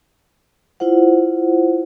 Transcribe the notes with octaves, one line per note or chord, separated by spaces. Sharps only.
E4 F4 C5 F#5